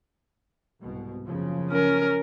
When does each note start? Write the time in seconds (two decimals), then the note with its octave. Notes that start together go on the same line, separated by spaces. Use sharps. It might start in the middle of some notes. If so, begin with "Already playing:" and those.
0.80 C2 G#2 B2
1.25 F#1 C#3 F3
1.70 C#4 A#4